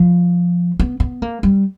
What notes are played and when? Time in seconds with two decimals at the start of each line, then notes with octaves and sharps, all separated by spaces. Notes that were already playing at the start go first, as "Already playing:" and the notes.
Already playing: F3
0.80 B3
1.00 B3
1.22 A#3
1.43 G3